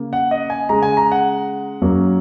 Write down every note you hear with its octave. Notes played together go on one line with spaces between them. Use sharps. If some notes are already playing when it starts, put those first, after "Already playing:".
Already playing: C#3 A#3
F#5
D#5
G#5
C#3 G#3 A#5
G#5
A#5
F#5
F#2 F#3 A#3